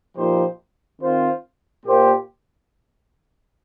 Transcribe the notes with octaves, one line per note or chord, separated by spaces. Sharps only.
A#2 F3 D#4 G4 C5
D#3 C4 F4 C5
A#2 A#3 G4 C5